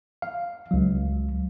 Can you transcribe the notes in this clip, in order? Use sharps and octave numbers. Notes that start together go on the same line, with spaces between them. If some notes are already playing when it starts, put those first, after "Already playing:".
F5
C#2 F#3